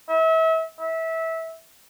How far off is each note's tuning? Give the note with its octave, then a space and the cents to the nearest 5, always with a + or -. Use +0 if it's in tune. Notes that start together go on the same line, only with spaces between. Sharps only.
E5 -35
E5 -20